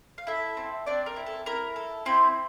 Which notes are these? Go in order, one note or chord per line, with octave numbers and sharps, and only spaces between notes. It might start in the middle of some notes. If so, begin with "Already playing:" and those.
F5
E4 A4 E5
C4
C4 D4 D5
A#4
E4
A4
E4 A#4
A4
C4 E4 C5